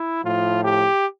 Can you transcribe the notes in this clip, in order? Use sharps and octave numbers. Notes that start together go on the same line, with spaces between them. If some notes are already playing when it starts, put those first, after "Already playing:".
Already playing: E4
A2 F3 F4
G4